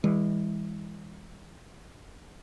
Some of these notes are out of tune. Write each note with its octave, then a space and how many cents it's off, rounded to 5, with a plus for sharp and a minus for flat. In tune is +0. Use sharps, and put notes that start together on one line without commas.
E3 -15 G#3 -40